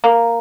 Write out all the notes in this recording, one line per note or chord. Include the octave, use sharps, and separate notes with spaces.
A#3